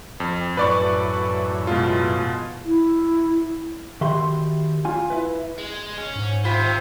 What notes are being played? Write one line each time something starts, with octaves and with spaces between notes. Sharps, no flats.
F2
F#2 A2 E3 B4 D5 C#6
B2 G#3 F4
E4
D#3 F#4 G4 E5 B5 C6
F4 G#5
E4 B4
G#3
C#4
G#2
C3 F4 C5 E5 B5 B6
D#3